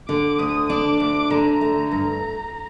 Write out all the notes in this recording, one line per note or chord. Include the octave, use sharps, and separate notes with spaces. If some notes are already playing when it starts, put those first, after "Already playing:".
D3 D6
D2 D#6
D4 D6
D2 D6
D3 A#5
A3
G2 A#5